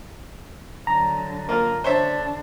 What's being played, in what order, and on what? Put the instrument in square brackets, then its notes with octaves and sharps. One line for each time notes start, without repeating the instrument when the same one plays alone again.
[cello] D3 F#3 [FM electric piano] A#5
[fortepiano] A#3 F4 A#4
[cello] D3 D4 [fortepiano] C5 C#5 E5